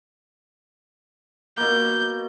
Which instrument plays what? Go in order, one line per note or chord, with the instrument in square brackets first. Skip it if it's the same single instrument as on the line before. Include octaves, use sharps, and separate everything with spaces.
[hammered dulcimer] B2 A#3 [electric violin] G6